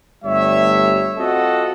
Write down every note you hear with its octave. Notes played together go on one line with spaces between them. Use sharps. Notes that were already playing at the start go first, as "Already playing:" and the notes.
G1 G3 A3 C#5 E5
C4 F4 F#4 A4 D#5 F#5